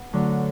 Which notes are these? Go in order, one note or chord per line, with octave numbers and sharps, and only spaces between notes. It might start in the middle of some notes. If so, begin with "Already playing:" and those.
Already playing: B3
D2 D3 F#3